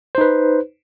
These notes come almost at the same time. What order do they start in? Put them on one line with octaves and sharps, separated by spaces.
C5 D#4 B4